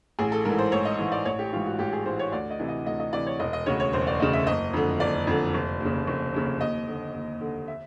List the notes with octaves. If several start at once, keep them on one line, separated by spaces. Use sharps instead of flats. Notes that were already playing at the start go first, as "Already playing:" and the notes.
A1 G#4
A4
G#2 E3 A#4
C5
A1 C#5
D#5
G#2 E3
D5
A1 C#5
G4
G#2 E3 F4
F#4
A1 G4
G#4
G#2 E3 C5
C#5
D2 D5
D#5
C3 E3
D#5
D2 D#5
D#5
C3 E3 D5
C#5
E1 D#5
D#5
D2 C#3 C#5
C#5
E1 C5
D5
D2 C#3 D#5
E5
F#1 D#5
F2 D3
F#1 D5
F2 D3
F1
D#2 C#3
F1
D#2 C#3
D#2 D#5
D3
D#2
D3
E5